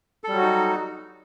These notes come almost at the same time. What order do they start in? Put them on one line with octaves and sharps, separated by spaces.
A4 G3 F#3 F#4 D#4